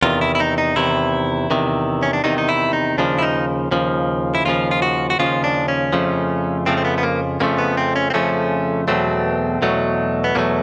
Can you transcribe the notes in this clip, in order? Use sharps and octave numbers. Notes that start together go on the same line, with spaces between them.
E2 C3 D#3 F4
E4
E4
D#4
D#4
E2 C3 D#3 E4
E2 C3 D#3
C#4
D4
E2 C3 D#3 D#4
D#4
E4
D#4
D#2 C#3 F3 D4
E4
D#4
D#2 C#3 F3
E4
D#2 C#3 F3 F4
F4
F#4
F#4
D#2 C#3 F3 F4
D4
C#4
F2 C#3 F3 A3
F2 C#3 F3 A3 C4
C4
B3
B3
A#3
F2 C#3 F3 A3 A#3
B3
C4
C#4
C4
F2 C#3 F3 A3 C#4
E2 B2 F#3 A3 C4
E2 B2 F#3 A3
B3
E2 B2 F#3 A3 A#3